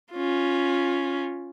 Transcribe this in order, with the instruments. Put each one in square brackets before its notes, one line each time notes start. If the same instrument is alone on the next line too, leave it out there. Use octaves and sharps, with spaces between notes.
[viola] C#4 F4